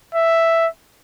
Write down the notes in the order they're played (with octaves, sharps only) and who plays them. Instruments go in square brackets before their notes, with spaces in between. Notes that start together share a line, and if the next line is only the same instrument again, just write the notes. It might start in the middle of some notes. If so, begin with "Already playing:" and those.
[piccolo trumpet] E5